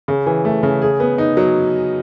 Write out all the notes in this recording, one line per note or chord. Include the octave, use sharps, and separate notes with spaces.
C#3
E3
A3
C#3
G#4
B3
D#4
F#3